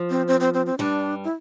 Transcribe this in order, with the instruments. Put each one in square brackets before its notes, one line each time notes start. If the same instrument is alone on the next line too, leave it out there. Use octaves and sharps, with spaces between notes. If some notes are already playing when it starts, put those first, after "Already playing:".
Already playing: [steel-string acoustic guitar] F3
[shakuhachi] C4
C4
C4
C4
C4
[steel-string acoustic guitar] G2 G3 [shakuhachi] D4
[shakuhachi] E4